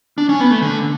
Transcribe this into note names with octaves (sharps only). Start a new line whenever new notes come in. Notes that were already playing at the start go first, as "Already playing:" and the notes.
D4
C#4
B3
A3
D3